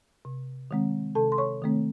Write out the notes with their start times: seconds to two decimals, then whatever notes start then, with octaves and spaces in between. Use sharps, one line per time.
0.25 C3
0.71 D#3 G#3 C4
1.15 C3 A4 A5
1.32 C6
1.38 C#5 C#6
1.62 D#3 A3 C4